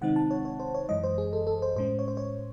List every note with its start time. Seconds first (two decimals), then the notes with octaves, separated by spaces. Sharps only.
0.01 C3 D#3 G#3 C4 D#4 F#5
0.16 A5
0.31 C#5
0.45 C#5
0.60 C5
0.74 C#5
0.89 F#2 E3 G#3 D#5
1.04 C5
1.18 G#4
1.33 A4
1.47 A4
1.62 C5
1.76 A2 G#3 C#4 C5
1.99 C#5
2.08 C5
2.17 C#5